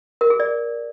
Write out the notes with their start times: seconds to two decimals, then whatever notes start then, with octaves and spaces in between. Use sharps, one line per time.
0.21 A#4
0.30 G#4
0.40 D5